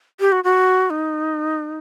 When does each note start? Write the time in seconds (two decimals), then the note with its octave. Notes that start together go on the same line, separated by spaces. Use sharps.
0.20 G4
0.32 F#4
0.44 F#4
0.90 D#4